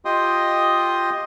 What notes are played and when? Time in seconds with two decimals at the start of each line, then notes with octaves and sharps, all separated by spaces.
0.05 F4 G4 D#5 G5 C6 D#6